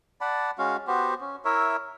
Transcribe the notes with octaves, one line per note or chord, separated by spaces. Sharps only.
D5 F#5 A5 B5
G#3 C#4 F#4 F5
B3 F#4 G4 C5
C#4
E4 A#4 C#5 E5